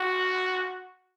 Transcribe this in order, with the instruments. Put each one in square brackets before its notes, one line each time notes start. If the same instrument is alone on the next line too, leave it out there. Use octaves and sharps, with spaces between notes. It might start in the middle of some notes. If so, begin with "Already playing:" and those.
Already playing: [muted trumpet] F#4